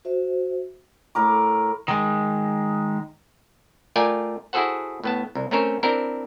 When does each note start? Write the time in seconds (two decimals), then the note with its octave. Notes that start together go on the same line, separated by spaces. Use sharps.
0.05 F#4 C5 E5
1.15 A2 A#4 D6
1.88 D#3 G#3
3.96 A3 F4 A#4 D5 G5 G#5
4.53 E4 F#4 G#4 A4 C5 F#5
5.04 A2 B3 A5
5.35 C2
5.51 A3 C4 C#4 A#4 C5 C#5
5.83 C4 D4 E4 A#4